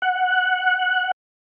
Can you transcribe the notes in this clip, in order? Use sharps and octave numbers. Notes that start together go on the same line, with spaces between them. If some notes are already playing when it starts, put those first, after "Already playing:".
F#5